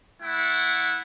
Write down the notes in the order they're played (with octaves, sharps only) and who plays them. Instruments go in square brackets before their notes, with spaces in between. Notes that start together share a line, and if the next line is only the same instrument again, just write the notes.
[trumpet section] A3 E4 F#5